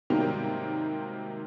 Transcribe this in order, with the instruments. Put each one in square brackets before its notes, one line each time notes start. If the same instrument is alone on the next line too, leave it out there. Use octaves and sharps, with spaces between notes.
[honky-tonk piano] G#2 C3 D#3 F#3 G3 A#3